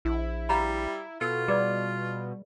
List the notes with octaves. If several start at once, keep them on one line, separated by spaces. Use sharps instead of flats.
A#1 E4
G3 F5 A#5 B5
B2 F4 A4
G3 G#4 B4 D5